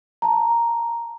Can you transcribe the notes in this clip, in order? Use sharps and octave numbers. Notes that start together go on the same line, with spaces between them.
A5 A#5